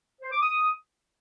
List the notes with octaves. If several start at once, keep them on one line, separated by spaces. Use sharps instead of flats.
C5
D6
D#6